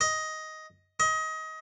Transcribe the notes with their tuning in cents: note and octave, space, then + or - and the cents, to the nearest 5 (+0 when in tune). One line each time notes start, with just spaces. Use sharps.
D#5 +10
D#5 +25